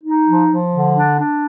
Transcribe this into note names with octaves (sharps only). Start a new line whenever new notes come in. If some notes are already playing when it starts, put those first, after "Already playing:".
D#4
F3
F3
D3
D4
D4